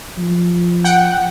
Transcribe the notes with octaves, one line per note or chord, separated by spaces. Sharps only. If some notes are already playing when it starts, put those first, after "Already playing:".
F3
F#5 G5